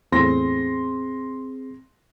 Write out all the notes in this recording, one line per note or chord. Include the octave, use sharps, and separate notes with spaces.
E2 A2 C4 G#4 C6 A#6